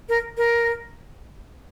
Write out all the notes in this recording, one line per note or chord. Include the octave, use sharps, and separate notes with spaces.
A#4
A#4